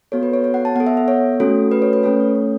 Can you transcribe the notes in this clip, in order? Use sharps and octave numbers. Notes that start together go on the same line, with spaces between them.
B3 F#4 A4 C#5
B4
C#5
C#5
F#5
A5
B3 A4 F#5
E5
E5
C#5
A3 C#4 F#4 A4
B4
C#5
B4
A3 C#4 A4 C#5
C#5
C#5